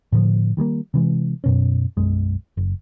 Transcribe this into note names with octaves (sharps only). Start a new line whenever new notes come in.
A2 D3 E3 F3
D#3 G3 G#3 A#3
C3 E3 G#3
F#2 B2 C#4
B1 F#2 G#3
F#1